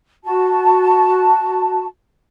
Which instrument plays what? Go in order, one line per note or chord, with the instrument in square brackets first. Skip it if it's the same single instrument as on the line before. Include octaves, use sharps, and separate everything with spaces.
[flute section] F#4 A5